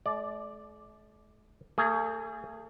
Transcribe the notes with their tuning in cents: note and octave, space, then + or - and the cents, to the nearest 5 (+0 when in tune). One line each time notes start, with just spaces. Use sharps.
A3 -45 D5 +0
A3 +40 G#4 +0